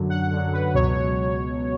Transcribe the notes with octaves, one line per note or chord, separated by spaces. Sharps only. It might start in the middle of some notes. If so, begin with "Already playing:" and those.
Already playing: F#2 D3 F#3
F#5
F#2 D3 F#3
B4
C#2 B2 F#3 C#5